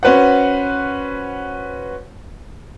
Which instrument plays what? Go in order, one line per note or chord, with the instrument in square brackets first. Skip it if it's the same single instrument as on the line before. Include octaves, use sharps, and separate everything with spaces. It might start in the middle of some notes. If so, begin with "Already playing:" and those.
[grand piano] C#4 F#4 B4 C5 F#5